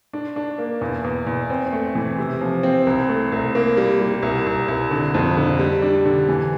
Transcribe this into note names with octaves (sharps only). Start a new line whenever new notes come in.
D4
D4
A#3
E2
E2
E2
C4
A3
E3
C3
F3
C4
C2
A3
C2
A#3
G3
G3
C2
C2
C2
D3
F2
D3
G3
D4
D3
E3